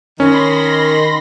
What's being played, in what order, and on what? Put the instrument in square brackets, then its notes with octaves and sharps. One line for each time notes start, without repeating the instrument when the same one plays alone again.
[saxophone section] D#3 [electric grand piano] C#4 [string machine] B5 C6 A#6